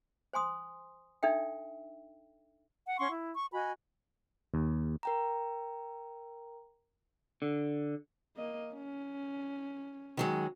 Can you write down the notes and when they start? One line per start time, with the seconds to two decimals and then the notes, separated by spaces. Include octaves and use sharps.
0.33 C5 G#5 C6 D#6
1.23 D4 D#4 A4 E5 G5
2.85 F#5
2.99 C#4 F#5 C6 C#6
3.11 E4
3.35 C#6
3.53 F#4 D#5 G#5 B5
4.54 D#2
5.03 A#4 G5 A#5
7.42 D3
8.36 A#3 D#5
8.74 C#4
10.17 D#3 F#3 G#3